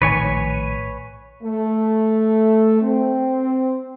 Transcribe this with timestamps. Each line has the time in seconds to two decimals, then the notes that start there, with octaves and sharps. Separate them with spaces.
0.02 A#1 A2 D#3 B4 C#5 G#5
1.43 A3
2.82 C4